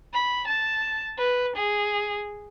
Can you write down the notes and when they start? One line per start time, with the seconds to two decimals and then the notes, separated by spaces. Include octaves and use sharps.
0.13 B5
0.47 A5
1.18 B4
1.56 G#4